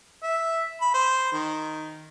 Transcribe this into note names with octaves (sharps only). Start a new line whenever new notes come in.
E5
B5
C5
D#3